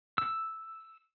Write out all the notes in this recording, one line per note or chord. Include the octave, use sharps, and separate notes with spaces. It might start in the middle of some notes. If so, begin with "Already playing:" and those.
E6